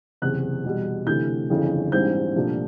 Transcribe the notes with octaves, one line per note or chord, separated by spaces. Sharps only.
F#1 E2 C3 F#6
E2 B2 G3
D2 C3 E3 A3 G6
G1 F2 C#3 E3
A#1 G#2 E3 G3 C4 G6
C2 A#2 F3 A3 D4